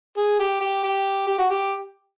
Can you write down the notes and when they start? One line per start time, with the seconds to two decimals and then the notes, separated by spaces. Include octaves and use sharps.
0.17 G#4
0.39 G4
0.60 G4
0.83 G4
1.27 G4
1.38 F#4
1.50 G4